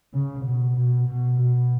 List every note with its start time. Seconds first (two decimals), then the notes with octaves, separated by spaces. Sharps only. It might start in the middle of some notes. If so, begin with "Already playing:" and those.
0.14 C#3
0.45 B2
0.76 B2
1.08 B2
1.39 B2